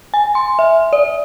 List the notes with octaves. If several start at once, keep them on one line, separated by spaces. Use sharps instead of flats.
G#5
C6
E5
D5